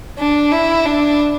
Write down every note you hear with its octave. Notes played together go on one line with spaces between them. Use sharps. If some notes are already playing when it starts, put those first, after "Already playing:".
D4
E4
D4